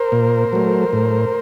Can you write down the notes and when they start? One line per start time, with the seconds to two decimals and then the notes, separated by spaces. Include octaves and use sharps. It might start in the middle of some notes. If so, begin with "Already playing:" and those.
Already playing: A#4 C5
0.12 A#2
0.53 F#3 A3
0.93 A2